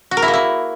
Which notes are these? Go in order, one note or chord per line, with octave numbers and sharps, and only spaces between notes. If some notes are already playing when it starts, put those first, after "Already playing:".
F#4
A#4
E4
A#3
E4